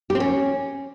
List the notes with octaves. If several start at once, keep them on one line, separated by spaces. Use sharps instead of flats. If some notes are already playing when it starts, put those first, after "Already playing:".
G4
C4
C#4